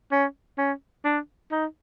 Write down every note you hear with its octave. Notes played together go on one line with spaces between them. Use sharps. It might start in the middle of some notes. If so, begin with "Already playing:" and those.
C#4
C#4
D4
D#4